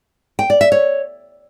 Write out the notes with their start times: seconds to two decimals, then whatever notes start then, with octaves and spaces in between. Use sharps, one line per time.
0.39 G5
0.50 D5
0.61 E5
0.72 C#5